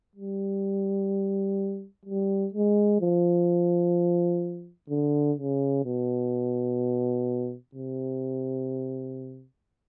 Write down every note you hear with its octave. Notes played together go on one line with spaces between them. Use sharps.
G3
G3
G#3
F3
D3
C#3
B2
C3